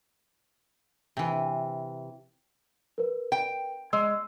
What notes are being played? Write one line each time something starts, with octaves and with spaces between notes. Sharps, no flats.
C3 E3
A#4 B4
G5
G#3 E6